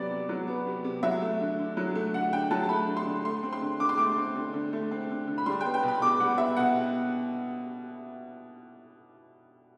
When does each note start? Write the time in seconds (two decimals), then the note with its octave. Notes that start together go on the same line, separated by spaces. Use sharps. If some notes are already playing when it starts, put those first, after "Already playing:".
Already playing: C3 F#3 B3 D5
0.11 C3
0.29 F#3
0.47 B3
0.67 C3
0.84 C3
1.03 F#3 E5
1.22 A3
1.41 D3
1.59 D3
1.77 F#3
1.95 A3
2.14 D3 F#5
2.32 D3 G5
2.51 F#3 A5
2.64 A5
2.69 A3 B5
2.88 D3
2.97 C6
3.06 D3
3.25 A3 C6
3.43 C4
3.53 C6
3.61 D3
3.80 D3 D6
3.89 C6
3.98 A3 D6
4.17 C4
4.35 D3
4.53 D3
4.73 A3
4.91 C4
5.10 D3
5.27 D3
5.38 B5
5.46 G3 C6
5.61 B3 G5
5.74 G5
5.83 B2
5.88 B5
6.01 B2 D6
6.20 G3 F#5
6.38 B3 E5
6.57 B2 F#5